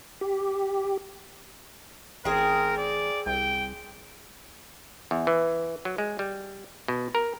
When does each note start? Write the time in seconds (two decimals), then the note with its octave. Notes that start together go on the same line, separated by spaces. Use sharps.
0.21 G4
2.25 A1 C4 G#4 A#4
2.77 D5
3.26 C2 G5
5.11 E2
5.27 E3
5.85 F#3
5.98 G#3
6.19 G3
6.88 B2
7.15 A#4